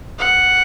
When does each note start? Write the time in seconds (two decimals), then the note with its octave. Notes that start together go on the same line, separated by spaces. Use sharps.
0.19 F#5